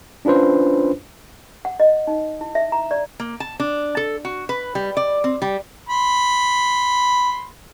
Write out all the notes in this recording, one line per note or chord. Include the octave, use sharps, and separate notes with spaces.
C#4 D4 F4 B4 C5
F#5
D#5
D#4
E4
E5
A#5
D5
A#3
A5
D4
A4
F#4
B4
G3
D5
C4
G3
B5 C6